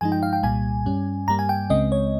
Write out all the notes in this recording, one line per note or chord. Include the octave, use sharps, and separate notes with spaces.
G2 F3 G#3 D#4 G#5
G5
F5
G5
C2 A#2 G3 G#5
G2 G3 C#4
G2 G3 A#3 A#5
G#5
G5
C#2 C#3 G#3 C4 D#5
C#5